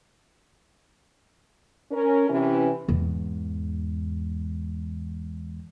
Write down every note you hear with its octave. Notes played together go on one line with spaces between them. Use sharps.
C#4 A#4
C3 E3 C#4
E2 G#2